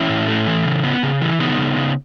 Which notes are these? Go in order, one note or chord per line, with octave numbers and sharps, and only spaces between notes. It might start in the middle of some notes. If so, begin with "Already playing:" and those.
Already playing: E3 C#4 E4
A2
A3
E3
C#3
B3
C#3
E3
C#3 B3 D#4
C#3
C#3